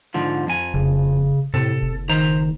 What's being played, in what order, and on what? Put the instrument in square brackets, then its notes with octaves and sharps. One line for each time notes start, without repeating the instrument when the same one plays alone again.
[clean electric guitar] G#2 D3 F3
F2 G#5
[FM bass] F1 [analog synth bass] C#3
[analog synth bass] A2 [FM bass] C3 [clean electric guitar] A4
[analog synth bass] F#1
[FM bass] D#3 [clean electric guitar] C5 A#5